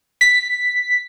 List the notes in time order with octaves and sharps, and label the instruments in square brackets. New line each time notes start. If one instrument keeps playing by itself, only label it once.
[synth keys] B6